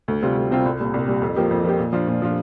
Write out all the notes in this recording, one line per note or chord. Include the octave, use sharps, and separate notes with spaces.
D2
C3 G3 C4 F4
D2
C3 G3 C4 F4
C2
A#2 G3
C2
A#2 G3
F2
F3 A#3 G4
F2
F3 A#3 G4
A#2
F3 D4 F4
A#2
F3 D4 F4